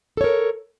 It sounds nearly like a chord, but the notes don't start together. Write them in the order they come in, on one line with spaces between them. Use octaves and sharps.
A4 C#5 A#4